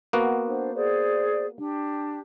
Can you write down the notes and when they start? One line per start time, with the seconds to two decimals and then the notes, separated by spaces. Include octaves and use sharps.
0.13 A#3 B3 F#4
0.47 D4 C5
0.75 G#4 C5 D5
1.59 D4 G4